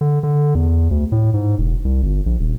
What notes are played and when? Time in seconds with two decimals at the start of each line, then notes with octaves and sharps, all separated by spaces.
0.01 D3
0.23 D3
0.55 E2
0.91 D2
1.12 A2
1.34 G#2
1.58 E1
1.85 C2
2.03 G1
2.26 A#1
2.39 D#1